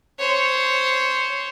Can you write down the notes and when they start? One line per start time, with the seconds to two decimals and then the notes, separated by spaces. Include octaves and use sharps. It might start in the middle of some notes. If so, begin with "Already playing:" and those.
0.19 C5 C#5